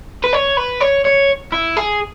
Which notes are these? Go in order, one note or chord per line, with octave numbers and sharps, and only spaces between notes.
B4
C#5
B4
C#5
C#5
E4
G#4